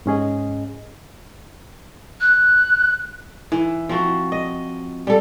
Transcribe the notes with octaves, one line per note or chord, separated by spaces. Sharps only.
G#2 C#4 G#4 D#5
F#6
E3
F3 C4 F#4
D#5
G3 A4